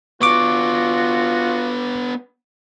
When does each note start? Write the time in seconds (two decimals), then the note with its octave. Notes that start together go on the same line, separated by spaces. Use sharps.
0.22 B3 D4 F4 F#4 C#6 D6